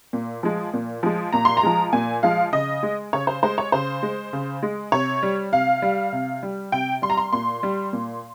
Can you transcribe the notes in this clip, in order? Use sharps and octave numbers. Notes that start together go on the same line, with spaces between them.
A#2
F3 G#3
A#2
F3 G#3
A#2 A#5
C6
A#5
F3 G#3
A#2 G#5
F3 G#3 F5
C#3 D#5
G#3
C#3 C#5
C5
G#3 C5
C#5
C#3 C5
G#3
C#3
G#3
C3 C#5
G3
C3 F5
G3
C3
G3
C3 G5
G3 C6
A#5
C6
A#2 C6
G3
A#2